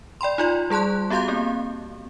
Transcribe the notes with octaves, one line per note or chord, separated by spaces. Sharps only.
D5 G5 B5 C6
D#4 F4 D5
G3 G#4 A5 C6 F#6
B3 F#4 G4 F5 C6 G6
A#3 C4